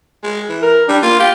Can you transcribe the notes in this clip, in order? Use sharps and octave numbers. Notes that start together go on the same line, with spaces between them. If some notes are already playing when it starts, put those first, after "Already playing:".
G#3
E3
A#4
G3 D4
A#3 F4
G4 F5